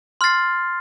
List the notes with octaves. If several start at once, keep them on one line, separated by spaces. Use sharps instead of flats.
C6 F6 A6 C7